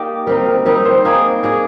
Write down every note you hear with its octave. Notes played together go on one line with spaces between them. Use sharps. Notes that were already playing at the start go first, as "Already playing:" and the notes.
Already playing: A#3 D#4 G4 D5
G3 C4 D#4 A#4
A#4
G3 C4 D#4 A#4
C5
A#3 D#4 G#4 D5
A#3 D#4 G#4 D5